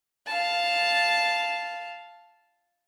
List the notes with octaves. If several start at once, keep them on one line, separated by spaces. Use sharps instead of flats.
F5 A5